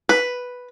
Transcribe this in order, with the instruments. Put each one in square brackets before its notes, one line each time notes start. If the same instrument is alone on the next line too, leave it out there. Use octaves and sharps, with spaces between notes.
[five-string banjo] B4